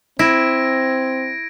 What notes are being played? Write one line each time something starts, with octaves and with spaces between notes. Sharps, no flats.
C4 E4 G#6 A#6 D7